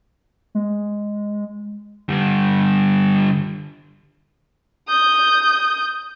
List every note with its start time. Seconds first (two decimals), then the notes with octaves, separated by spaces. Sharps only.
0.55 G#3
2.09 D3 G3
4.88 D#6 G6